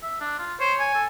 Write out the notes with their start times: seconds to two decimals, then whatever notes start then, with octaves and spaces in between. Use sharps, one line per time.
0.03 E5
0.21 D4
0.39 F4
0.60 C5 C#5
0.80 G#5
0.95 A4